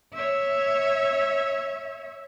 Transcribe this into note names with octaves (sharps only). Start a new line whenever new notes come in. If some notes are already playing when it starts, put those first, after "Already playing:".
C#5 E5